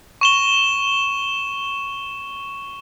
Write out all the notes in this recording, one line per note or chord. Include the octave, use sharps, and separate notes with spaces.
C#6 E7 G7